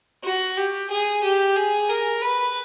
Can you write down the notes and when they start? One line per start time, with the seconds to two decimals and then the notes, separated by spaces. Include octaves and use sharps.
0.24 F#4
0.57 G4
0.91 G#4
1.24 G4
1.56 G#4
1.89 A#4
2.22 B4